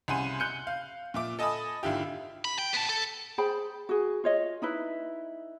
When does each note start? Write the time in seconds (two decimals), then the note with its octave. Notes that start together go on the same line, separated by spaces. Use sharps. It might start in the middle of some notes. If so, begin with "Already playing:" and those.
0.08 C2 C#3 F#5 G#5 C6 D#7
0.40 F#6 G6 C#7
0.67 F5
1.14 A#2 E5 D6
1.39 A4 D#5 G#5 A5 B5 D#6
1.83 G#1 D3 E4 F4 G4
2.45 B5
2.59 G5
2.74 B3 A5
2.89 A4
3.38 G#4 C5 G5 B5
3.89 F#4 G#4
4.24 F4 C#5 D#5
4.62 D#4 E4 B4